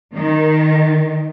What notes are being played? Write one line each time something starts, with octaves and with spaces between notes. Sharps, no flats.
D#3